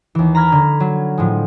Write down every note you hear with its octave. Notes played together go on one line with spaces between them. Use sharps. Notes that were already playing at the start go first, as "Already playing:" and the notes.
D#2 E3
A#5 B5 F6 G#6 A#6
D3
F#3
A2 F3 G#3